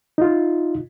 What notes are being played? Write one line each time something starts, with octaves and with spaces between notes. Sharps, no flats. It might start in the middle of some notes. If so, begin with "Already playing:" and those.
D#4 F4